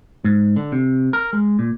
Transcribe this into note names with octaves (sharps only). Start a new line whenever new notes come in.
G#2
D3
C3
A#4
G#3
A#2